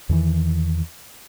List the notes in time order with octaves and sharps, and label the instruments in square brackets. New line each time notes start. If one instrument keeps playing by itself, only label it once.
[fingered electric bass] E2 D#3 E3